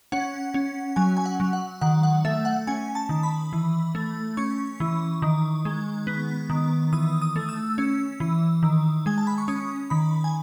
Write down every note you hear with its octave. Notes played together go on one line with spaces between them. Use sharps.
C#4 F#5
C#4
F#3 G#5
G#5
F#5
F#3
F#5
D#3 F#5
F#5
A3 E5
F#5
C#4 G#5
A5
D#3
B5
E3
A3
C#4 C#6
E3
D#3
G#3
B3
D#3
E3 D#6
D#6
A3
E6
C#4
E3
D#3
G#3 G#5
A5
B5
C#6
C#4 D#6
D#3 B5
G#5